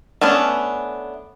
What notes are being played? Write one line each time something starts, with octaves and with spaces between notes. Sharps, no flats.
A3 B3 C#4 D4